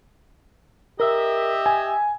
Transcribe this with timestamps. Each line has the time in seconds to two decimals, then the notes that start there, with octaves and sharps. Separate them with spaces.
1.00 G4 A#4 D#5 E5
1.66 G#5